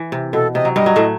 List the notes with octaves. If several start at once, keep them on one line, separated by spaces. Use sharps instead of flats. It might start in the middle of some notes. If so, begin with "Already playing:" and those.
Already playing: E3
C3
B2 A4
C3 D#5
F#3
G2 G3 D#5
F#3
A2 A3